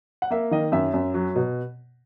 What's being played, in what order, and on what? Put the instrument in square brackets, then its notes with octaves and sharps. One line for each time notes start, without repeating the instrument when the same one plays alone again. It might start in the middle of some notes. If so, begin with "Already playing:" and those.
[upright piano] F#5
A#3 E5
D#3 D#5
F#2 E5
F#2
F#3
B2